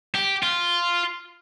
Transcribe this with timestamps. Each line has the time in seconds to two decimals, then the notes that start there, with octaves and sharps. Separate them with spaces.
0.14 G4
0.43 F4